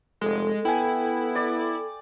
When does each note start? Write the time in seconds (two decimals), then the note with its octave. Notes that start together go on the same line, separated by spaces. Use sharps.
0.21 F1 G#3 A4
0.65 B3 E4 G5 G#5
1.35 D5